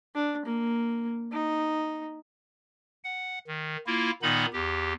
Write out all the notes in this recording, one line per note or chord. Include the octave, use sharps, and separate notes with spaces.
D4
A#3
D#4
F#5
D#3
A#3 E4 F4
A#2 D#3 B3 D#4 B5
E2 G4